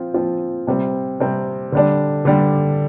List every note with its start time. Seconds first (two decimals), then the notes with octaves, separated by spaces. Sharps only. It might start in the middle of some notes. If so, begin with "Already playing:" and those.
Already playing: F3 C4 F4
0.14 F3 C4 F4
0.67 C3 G3 C4
1.20 C3 G3 C4
1.72 D3 G3 D4
2.25 D3 G3 D4